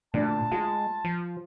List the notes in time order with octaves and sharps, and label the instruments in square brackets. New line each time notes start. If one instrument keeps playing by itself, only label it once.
[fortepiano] D2 D4 D5 [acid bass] A#2 [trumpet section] A5
[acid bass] G#3 [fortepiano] F4
[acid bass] F3